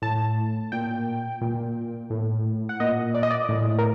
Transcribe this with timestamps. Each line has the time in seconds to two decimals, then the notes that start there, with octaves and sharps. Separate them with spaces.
0.02 A2 A5
0.72 A#2 G5
1.41 A#2
2.10 A2
2.69 F#5
2.80 A#2 D#5
3.15 D5
3.23 D#5
3.31 D5
3.49 A2
3.78 A#4